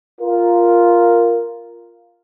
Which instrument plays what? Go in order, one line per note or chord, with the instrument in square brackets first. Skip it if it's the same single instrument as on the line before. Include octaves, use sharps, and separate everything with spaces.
[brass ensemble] F4 A#4